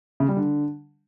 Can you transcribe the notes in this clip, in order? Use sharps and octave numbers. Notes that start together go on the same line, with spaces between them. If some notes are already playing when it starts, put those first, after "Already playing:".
C#3
G3
D3